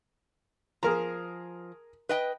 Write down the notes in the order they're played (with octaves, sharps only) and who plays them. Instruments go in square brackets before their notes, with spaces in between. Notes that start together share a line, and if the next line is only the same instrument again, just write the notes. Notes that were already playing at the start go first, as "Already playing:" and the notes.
[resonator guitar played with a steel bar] F3 [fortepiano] G#4 A#4 A#5
[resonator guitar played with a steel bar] B4 D#5 G5